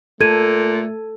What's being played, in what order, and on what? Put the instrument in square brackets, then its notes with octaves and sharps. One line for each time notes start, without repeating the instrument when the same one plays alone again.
[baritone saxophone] A#2 [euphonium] A3 [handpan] A4 [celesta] G#6 D#7